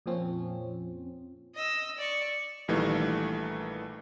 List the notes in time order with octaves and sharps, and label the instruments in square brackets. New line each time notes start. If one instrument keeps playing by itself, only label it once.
[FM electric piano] F2 A#2 F3 C4 C#4
[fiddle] D#5 E6
D5 C#6
[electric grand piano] A#1 D#3 E3 G3 A3 A#3